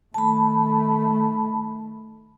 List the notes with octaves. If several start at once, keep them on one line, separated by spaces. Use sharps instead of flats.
D#3 A3 A5 B5